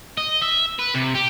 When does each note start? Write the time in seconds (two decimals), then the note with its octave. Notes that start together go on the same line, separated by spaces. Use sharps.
0.18 D#5
0.42 E5
0.79 B4
0.94 C3
1.15 G4